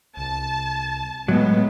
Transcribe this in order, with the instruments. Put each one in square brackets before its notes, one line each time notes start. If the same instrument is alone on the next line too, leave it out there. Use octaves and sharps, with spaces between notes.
[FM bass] C2 [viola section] A5
[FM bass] A2 [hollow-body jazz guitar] F#3 [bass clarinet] G#3 [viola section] B3